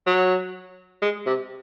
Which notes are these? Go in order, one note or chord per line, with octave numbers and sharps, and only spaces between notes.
F#3
G#3
C3